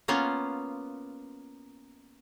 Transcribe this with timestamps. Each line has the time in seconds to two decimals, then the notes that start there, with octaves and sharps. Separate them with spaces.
0.08 A#3 B3 C#4 F4